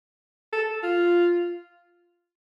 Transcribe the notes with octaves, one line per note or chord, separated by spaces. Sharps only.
A4
F4